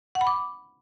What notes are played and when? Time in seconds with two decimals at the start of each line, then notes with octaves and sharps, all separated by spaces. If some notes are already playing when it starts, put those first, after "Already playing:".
0.15 F#5
0.21 B5
0.27 D6